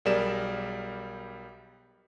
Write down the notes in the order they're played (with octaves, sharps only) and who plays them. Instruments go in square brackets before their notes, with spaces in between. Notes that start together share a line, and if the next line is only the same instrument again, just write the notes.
[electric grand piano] B1 G3 G#4 A#4 D5 E7